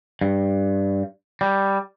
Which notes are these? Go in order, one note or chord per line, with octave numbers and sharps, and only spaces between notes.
G2
G3